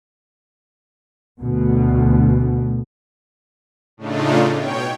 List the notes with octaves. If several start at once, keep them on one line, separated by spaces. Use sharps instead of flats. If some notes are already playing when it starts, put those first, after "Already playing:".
D2 B2
A2 C#3 A3 D4 D#4 F4
B2 C#5 G5